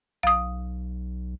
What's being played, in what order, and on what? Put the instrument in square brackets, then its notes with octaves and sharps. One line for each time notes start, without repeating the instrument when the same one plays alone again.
[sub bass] B1 [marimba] F5 D#6